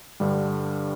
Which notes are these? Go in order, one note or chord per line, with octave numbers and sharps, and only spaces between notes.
G2 D3 G3